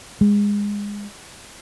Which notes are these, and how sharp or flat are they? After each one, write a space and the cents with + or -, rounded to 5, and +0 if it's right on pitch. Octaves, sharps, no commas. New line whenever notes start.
G#3 -20